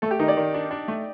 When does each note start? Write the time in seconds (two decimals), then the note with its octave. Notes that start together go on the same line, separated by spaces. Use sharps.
0.02 A3 A4
0.11 G4
0.19 D#3 D#4
0.28 D5
0.37 D#3
0.54 D4
0.71 D4
0.88 A3